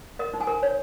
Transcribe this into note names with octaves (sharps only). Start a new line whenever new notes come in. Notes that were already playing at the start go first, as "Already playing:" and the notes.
A#4 D#5
D#4
G#5
A#4
C#5